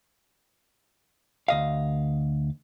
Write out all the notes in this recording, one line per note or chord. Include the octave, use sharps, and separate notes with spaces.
D2 D#5 F5